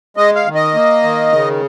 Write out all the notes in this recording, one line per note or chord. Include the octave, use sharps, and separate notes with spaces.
G#3 D#5
F5
D#3
D#5
A#3
D#3
C#3